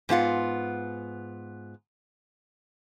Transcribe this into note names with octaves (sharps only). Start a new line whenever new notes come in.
G#2 B3 F4 F#5